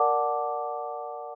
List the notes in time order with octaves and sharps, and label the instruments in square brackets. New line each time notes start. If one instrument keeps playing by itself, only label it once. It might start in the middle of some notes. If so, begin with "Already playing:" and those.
Already playing: [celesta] A#4 D5 F#5 A5 D6